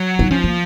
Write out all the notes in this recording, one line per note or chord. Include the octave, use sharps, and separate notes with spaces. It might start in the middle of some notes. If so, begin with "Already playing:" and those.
Already playing: F#3
D#4
F3 C#4
A#3